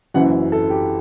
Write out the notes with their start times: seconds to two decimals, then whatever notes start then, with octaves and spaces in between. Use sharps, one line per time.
0.14 F#1 F#2 E3 F#5
0.52 A4
0.70 G4